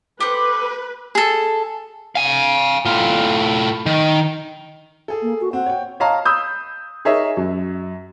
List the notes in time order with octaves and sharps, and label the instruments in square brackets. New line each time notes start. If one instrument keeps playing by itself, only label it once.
[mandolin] G4 A4 C5 [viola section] B4
[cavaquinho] G#4 A4
[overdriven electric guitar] F5 G#5
A2 F4
D#3
[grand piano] G#4 A4
[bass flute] A#3
F#4
[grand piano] C4 [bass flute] F#5
[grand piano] C#5 G5
C#5 D#5 F5 A5 A#5
B5 D#6 E6 G6
D#4 G#4 A#4 C#5 D#5 E5
F#2